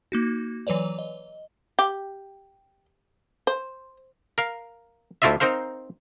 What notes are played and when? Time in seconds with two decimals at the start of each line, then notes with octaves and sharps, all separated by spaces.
0.12 A#3 D#4 F#4
0.67 E3 F#3 B4 C#5 D5
0.99 D#5
1.79 G4
3.47 C5
4.38 A#4 F5
5.22 D2 A3 E4 F4 D#5 E5
5.40 C4 D#4 A#4 C5 F5